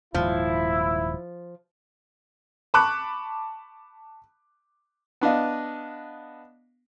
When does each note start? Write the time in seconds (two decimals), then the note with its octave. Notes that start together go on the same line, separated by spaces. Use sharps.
0.14 D#1 D#2 G#2 F3 E4
2.74 A5 B5 C#6 D6 F#6
5.21 B3 D4 D#5 F5